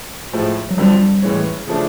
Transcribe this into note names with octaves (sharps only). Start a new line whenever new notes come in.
A2 F3 G#3
F#3
F2 D3 F3 G3
A2 E3 G#3 C#4
C#3 F3 A3 D4